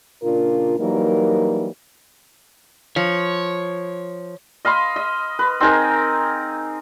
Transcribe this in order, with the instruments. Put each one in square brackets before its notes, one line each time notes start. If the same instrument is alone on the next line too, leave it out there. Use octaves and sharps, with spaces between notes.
[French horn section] A#2 C#3 D4 F4 A#4
E3 F#3 G3 A#3 D#4 A#4
[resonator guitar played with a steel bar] F3 [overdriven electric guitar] C#5
[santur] D#5 F5 B5 C6
D#5
B4
C4 D#4 G#4 A#4